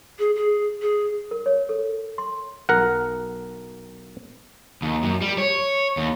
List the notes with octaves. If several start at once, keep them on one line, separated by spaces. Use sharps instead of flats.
G#4
G#4
G#4
A#4
C#5
A4
C6
B1 A#4 F#5
D#2
F#2
G3
C#5
D#2